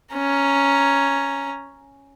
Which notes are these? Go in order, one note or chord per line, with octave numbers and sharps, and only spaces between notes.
C#4 A#5